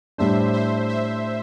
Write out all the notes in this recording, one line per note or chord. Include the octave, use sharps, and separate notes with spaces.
A2 G3 D4 C5 E5
C5 E5
C5 E5